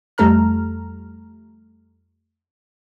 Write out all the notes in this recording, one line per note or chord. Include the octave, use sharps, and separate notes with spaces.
F2 G3 A3 A4 A#5 F6